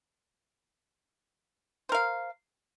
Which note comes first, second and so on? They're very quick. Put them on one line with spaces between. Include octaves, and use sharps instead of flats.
C5 A#4 F5